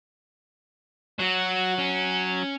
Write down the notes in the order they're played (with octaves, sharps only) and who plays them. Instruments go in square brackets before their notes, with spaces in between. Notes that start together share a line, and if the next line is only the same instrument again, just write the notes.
[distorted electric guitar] F#3 [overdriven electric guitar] F#4
[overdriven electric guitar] C#4